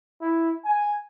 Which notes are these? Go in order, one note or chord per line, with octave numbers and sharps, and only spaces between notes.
E4
G#5